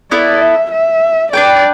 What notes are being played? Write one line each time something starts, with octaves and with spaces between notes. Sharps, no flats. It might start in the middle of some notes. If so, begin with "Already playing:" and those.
B3 E4 A4 D5
E5
E5
D4 B4 D5 G5